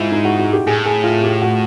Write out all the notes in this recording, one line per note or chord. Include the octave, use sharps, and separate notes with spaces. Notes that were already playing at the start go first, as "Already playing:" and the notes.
Already playing: G#2 E4 F4
D#4
F#4
F#4
G4
A2 G#4
G#4
F4
G4
F#4